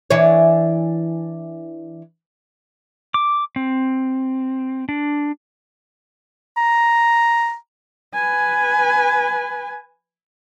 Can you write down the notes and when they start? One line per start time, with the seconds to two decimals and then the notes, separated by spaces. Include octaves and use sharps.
0.10 E3 D4 C#5
3.14 D6
3.56 C4
4.89 D4
6.57 A#5
8.14 B4 G#5